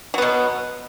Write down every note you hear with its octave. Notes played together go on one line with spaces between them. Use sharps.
B2 F#3 B3